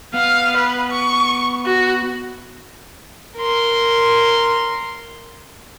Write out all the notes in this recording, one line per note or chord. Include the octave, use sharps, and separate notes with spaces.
B3 F5
B4
C#6
F#4
A#4 C6